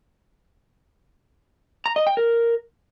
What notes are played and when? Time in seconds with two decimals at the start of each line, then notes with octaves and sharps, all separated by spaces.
1.86 A#5
1.96 D#5
2.07 G5
2.17 A#4